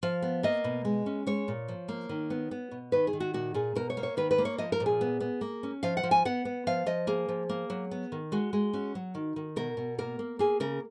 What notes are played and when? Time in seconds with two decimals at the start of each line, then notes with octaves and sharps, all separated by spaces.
0.03 F3 F5
0.22 B3
0.43 A#3 D#5
0.64 B2
0.85 G#3
1.06 C#4
1.27 G#3 C#5
1.48 A#2
1.68 F3
1.88 A#3
2.09 D#3
2.30 B3
2.51 B3
2.71 B2
2.92 D#3 B4
3.07 G#4
3.13 D#3
3.20 F#4
3.34 A#2 F#4
3.54 A#2 G#4
3.75 B2 A#4
3.90 C#5
3.97 A#3
4.03 C#5
4.17 D#3 B4
4.31 B4
4.38 A#3
4.45 C#5
4.58 F3 D#5
4.72 A#4
4.80 A#2
4.86 G#4
5.01 B3
5.20 B3
5.41 A#3
5.63 C#4
5.83 F3 F5
5.97 F#5
6.03 F3
6.11 G#5
6.25 B3 F#5
6.45 B3
6.67 F3 F5
6.86 F3 D#5
7.07 A#3 G#4
7.29 F3
7.49 A#3
7.70 F#3
7.91 B3
8.12 D#3
8.32 G#3 F#4
8.53 G#3
8.73 C#4 F#4
8.95 F#3
9.15 D#3
9.36 D#3
9.56 B2 A#4
9.77 B2
9.98 A#3 A#4
10.19 A#3
10.39 A#3 G#4
10.60 C#3 A#4